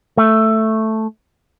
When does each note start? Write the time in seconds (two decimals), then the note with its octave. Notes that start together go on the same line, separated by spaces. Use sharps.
0.17 A3